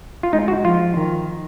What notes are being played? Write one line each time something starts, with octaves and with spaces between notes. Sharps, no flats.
F4
G#3 D#4
F#4
F3 F4
D#3